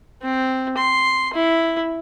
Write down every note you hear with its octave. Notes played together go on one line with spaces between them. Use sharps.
C4
C6
E4